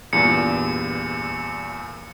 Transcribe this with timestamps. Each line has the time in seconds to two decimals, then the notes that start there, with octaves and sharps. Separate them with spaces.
0.13 E2 G2 A#2 C#7